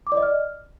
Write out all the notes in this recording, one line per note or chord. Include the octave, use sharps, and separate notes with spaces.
D6
D5
D#5
F6